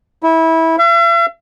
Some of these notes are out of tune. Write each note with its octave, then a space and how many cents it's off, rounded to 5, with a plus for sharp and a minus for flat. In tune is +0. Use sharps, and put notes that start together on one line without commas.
E4 -20
E5 +45